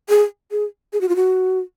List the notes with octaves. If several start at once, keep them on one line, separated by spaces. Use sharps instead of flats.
G#4
G#4
G#4
F#4
F4
F#4